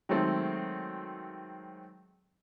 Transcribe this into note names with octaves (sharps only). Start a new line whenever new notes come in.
D#3 F#3 G#3 A3 C4